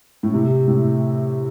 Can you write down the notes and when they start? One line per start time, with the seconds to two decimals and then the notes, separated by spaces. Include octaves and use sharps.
0.23 A2
0.33 C3
0.68 A2